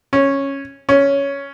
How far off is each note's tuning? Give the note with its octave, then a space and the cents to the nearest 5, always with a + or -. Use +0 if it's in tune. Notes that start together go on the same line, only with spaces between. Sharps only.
C#4 -10
C#4 +5